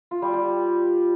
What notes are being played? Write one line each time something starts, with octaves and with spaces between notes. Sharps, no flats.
F4
G3
G4